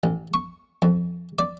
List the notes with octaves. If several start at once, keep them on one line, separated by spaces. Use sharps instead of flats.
A1
C#6
F2
D5